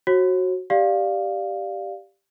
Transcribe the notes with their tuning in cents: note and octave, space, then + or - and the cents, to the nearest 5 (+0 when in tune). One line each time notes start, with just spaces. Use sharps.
F#4 +0 C#5 -45
G4 +0 D5 +0 F5 +0